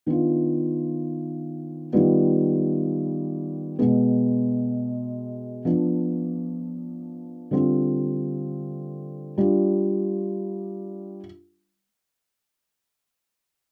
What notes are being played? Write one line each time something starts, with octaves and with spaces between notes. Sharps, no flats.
D#3 B3 D4 F4
D#3 G3 B3 F4
B2 G#3 B3
F3 B3 D4
D3 G3 C4 F4
G3 D4 F4